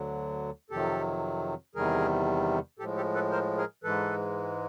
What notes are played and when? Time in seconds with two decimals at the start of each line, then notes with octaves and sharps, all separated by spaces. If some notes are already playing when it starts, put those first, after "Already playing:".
Already playing: D2 D3 F#3
0.70 F2 C3 D#3 F#3 G4 A4
1.75 E2 C3 D#3 G3 G#4 A#4
2.79 A2 F3 G#3 G4 A4
2.96 G4 A4
3.14 A4 B4
3.31 A#4 C5
3.57 G#4 A#4
3.84 G#2 E3 G#3 A4 B4